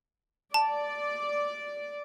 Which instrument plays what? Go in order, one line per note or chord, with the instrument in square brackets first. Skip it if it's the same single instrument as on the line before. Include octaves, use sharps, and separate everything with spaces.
[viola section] D5 [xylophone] A5